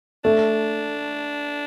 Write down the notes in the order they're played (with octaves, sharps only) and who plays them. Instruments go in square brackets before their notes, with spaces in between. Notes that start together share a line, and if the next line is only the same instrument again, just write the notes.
[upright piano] A3 [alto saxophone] D4